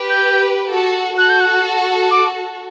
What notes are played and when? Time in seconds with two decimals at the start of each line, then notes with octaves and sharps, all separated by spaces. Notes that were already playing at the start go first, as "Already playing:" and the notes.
Already playing: G4 B4
0.10 G6
0.71 F#4 A4
1.18 F#4 A4 F#6
1.30 G6
1.41 F#6
2.11 D6